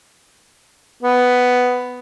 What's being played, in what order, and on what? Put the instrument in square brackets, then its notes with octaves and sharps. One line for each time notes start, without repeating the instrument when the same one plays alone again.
[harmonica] B3